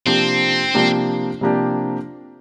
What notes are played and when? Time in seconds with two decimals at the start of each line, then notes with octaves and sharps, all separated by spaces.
0.06 C3 F3 A#3 C4 D4 G4
0.74 C3 F3 A#3 D4 G4
1.41 C3 F3 A#3 D4 G4